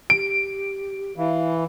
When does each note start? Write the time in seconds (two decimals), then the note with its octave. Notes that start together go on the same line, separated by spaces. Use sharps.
0.10 G4 D7
1.17 E3 F5